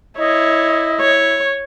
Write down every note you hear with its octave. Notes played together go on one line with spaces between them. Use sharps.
E4 C#5 D#5
C#5